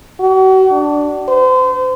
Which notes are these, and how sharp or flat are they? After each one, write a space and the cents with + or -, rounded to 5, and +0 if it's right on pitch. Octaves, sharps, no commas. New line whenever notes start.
F#4 +40
D4 +0
C5 -35